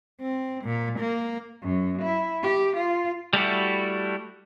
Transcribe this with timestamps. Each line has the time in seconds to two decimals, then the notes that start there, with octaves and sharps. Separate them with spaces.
0.21 C4
0.65 A#2
0.99 A#3
1.62 F#2
2.02 E4
2.43 G4
2.76 F4
3.33 G3 A3 E4 F#4